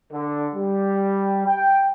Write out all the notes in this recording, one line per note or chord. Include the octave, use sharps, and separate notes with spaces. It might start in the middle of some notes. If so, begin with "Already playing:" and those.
D3
G3
G5